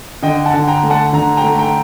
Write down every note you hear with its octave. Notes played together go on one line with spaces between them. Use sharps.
D3 D#5 G5
F#5 A5
D3
G5 A#5
A3
F#5 A5
D3 A#5
G5 A#5
A3
G5 A#5